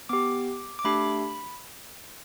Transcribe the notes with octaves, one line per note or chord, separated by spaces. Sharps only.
B3 G4 D6
D6
A3 D4 G4 B5